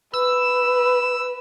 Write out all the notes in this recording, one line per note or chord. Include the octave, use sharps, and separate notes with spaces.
B4 E6